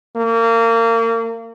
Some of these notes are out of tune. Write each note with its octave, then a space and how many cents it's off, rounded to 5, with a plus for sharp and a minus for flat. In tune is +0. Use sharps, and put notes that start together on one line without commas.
A#3 -30